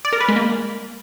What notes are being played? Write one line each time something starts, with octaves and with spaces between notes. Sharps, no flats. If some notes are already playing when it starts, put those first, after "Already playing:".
D5
A#4
B4
G#3
A#3